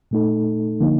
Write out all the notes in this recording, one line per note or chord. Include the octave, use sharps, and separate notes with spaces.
A#2 A3 D#4 A4
D3 F3 A#3 D#4